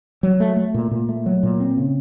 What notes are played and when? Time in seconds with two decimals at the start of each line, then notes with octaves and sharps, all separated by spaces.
0.23 F#3
0.40 A3
0.57 A3
0.74 A#2
0.91 A#2
1.09 A3
1.26 F#3
1.43 A#2
1.60 C4
1.77 C#3